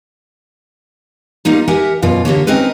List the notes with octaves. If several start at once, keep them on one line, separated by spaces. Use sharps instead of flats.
G3 A#3 D#4 F4
G4 A#4 E5 F#5 G#5
F#2 B2 F4 D5
D3 A#3 G4 C#5
C4 C#4 D#4 A#4 B4